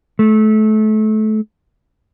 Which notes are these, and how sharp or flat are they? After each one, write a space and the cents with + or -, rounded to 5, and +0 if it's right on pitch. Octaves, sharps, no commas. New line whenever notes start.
A3 -25